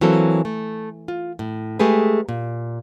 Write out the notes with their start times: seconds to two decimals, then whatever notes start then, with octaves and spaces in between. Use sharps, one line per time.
0.01 E3 F#3 A#3 C4 A4
0.45 A3
1.08 F4
1.39 A2
1.79 G#3 A3 G4 G#4 B4
2.29 A#2